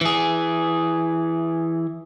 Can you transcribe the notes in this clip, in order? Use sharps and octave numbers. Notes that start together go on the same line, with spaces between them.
E3 G#4